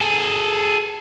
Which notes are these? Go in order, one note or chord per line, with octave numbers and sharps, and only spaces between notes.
G#4 A4